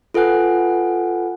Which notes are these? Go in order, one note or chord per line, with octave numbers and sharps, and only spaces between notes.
F4 A4 B4 F#5 G#5 F#6